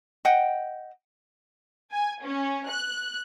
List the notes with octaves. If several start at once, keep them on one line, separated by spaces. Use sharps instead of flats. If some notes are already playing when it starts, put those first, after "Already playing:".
D#5 F#5 G5
G#5
C#4
F#6